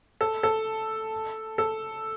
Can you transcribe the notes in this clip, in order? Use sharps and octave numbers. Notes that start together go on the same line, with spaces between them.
A4
A4
A4